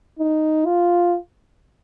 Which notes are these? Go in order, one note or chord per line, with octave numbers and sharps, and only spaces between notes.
D#4
F4